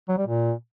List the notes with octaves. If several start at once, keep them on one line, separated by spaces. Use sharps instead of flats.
F#3
G3
A#2